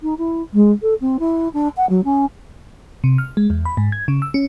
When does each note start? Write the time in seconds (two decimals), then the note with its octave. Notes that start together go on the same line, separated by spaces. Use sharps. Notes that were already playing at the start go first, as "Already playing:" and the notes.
0.03 D#4
0.18 E4
0.54 G#3
0.82 A4
1.01 C4
1.19 E4
1.54 D4
1.77 F#5
1.89 F#3
2.04 C#4
3.04 C3
3.18 F6
3.37 G#3
3.50 E2
3.65 B5
3.77 G#2
3.92 G#6
4.08 C#3
4.22 E6
4.34 C#4